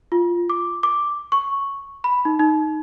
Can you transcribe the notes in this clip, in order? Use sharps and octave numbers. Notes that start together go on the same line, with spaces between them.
F4
D6
D6
C#6
B5
D#4
D#4